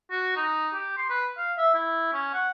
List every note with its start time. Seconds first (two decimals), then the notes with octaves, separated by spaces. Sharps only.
0.11 F#4
0.36 D#4
0.74 G4
0.97 C6
1.10 B4
1.37 F5
1.58 E5
1.74 E4
2.13 C#4
2.34 F#5